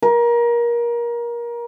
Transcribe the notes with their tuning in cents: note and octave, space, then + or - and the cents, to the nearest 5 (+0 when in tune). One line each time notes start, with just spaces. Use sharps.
A#4 +25